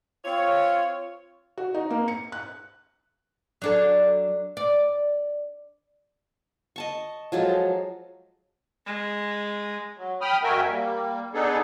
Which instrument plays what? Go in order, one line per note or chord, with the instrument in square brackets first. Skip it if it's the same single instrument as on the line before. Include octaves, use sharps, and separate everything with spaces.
[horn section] C4 F4 C#5
[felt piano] F#4
D#4
A#3
C#7
F#6
[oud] F#3 D4 A4
D5
[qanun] D#5 A5 C#6
F3 F#3 G#3 A4
[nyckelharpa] G#3
[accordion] F#3
G5 B5 D#6 F6
F2 F#4 A#4 E5 G5 G#5
G3 A#3
B3 D4 D#4 G#4 A4